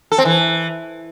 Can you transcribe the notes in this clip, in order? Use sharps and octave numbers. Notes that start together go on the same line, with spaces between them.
A4
C4
E3